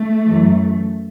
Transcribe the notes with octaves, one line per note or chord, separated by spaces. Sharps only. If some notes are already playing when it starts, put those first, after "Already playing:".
Already playing: A3
F#2 E3